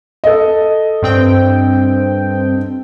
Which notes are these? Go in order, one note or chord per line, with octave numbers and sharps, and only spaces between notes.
A4 D#5
G2 C4 G5